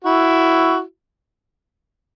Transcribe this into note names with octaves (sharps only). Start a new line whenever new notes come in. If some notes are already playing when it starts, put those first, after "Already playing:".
E4 F#4